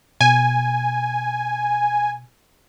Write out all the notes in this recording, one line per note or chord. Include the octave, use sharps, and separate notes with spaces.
B2 G#5